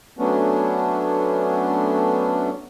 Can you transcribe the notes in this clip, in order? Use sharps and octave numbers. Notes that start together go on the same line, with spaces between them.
F#3 A3 B3 C#4 D4